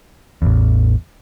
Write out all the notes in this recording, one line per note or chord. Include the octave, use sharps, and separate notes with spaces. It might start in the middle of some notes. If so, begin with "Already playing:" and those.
A1 E2